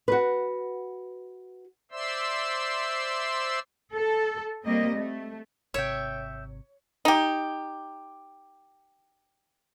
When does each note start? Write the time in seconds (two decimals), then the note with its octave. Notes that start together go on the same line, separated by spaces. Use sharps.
0.08 F#4 B4
1.91 C5 D5 E5 C6 E6
3.91 A4
4.65 G3 A#3 C4 D#5
4.96 A3
5.74 G#1 C3 C#5 E5 G5
7.05 D#4 G4